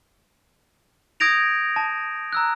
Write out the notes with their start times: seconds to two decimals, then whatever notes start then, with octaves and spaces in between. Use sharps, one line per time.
1.20 D#6 G6 G#6 A#6 D7 F7
1.76 A5
2.33 A#5 E6 F#6